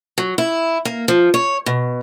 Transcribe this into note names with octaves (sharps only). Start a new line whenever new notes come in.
F#3
E4
A#3
F3
C#5
B2